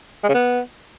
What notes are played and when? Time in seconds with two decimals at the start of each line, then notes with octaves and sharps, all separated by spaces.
0.23 G#3
0.29 C#3
0.34 B3